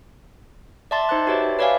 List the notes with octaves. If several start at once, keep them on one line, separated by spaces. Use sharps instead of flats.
D5 E5 A5 C6 A6
D#4 C5 A5 F#6
F#4 G4 B4 C#5 D5 E5
B4 C#5 D5 E5 F5 G#5